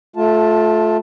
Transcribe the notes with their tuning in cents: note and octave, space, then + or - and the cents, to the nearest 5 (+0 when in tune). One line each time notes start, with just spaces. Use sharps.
A3 -15 F4 +20 A5 +0